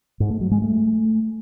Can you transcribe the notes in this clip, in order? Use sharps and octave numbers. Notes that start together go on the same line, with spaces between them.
G#2
A3
F#3
G#3
A3